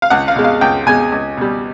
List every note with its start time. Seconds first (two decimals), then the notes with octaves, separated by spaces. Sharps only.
0.02 F5
0.10 C#2 F#5
0.28 F5
0.36 B2 G#3
0.44 F5
0.61 C#2 G5
0.86 B2 G#3 G#5
1.12 C#2
1.37 B2 G3